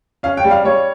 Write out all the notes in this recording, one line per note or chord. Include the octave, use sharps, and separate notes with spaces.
C#4 F5
G5
G3
F5
G3 C#5